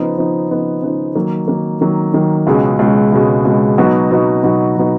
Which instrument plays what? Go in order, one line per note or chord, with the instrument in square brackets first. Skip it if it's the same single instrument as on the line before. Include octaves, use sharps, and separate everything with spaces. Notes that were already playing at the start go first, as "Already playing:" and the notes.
Already playing: [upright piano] C#3 F3 B3 D#4
C#3 F3 B3 D#4
C#3 F3 B3 D#4
C#3 F3 B3 D#4
D#3 F#3 A#3
D#3 F#3 A#3
D#3 F#3 A#3
D#3 F#3 A#3
C#2 B2 G#3 C#4
C#2 B2 G#3 C#4
C#2 B2 G#3 C#4
C#2 B2 G#3 C#4
B2 F#3 B3 D#4 F#4
B2 F#3 B3 D#4 F#4
B2 F#3 B3 D#4 F#4
B2 F#3 B3 D#4 F#4